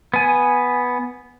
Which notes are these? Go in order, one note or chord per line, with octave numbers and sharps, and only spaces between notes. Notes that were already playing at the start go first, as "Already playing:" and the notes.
B3 G#5